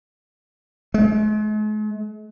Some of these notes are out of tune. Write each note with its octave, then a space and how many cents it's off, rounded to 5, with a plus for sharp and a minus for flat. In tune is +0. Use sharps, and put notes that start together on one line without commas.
G#3 +45